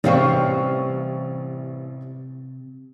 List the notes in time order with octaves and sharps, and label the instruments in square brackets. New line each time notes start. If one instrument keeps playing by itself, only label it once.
[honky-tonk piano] A1 F5 C#6 [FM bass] C3 [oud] E3 G3 C4